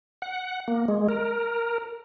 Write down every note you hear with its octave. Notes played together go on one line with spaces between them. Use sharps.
F#5
A#3
G#3
A#4